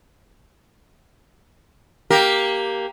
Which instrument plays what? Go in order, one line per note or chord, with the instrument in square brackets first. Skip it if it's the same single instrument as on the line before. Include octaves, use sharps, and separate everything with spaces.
[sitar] A#3 G4 A#4